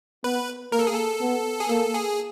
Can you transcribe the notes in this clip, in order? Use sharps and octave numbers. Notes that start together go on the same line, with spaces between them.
B3 B4
A#3 A#4
A4
G#4
A4
B3
G#4
A#3 A4
G#4